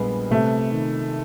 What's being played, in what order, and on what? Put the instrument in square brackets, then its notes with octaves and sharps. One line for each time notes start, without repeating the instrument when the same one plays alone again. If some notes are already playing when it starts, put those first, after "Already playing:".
Already playing: [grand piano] A#1 A#2 G3 B3 [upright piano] G#3
[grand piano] C3 [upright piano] A3
[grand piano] D#3